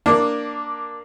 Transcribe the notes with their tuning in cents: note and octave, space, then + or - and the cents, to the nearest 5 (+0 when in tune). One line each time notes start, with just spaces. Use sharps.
A#3 +0 D4 +0